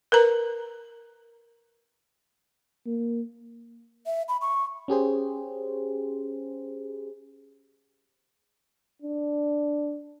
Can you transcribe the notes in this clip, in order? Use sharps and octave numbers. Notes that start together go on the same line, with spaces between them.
A#4 B4 A#5
A#3
E5
B5
C#6
C#4 G4 G#4 C5
D4